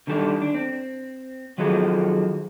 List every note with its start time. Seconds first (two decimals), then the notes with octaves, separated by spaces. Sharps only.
0.07 D3 D#3 G3 A4
0.42 D4
0.54 C4
1.58 D#3 F3 F#3 C4 G#4 A4